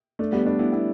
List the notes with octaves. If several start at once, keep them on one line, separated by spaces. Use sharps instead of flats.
A3 D4
G3 B3
A3 D4
B3 E4
B3 E4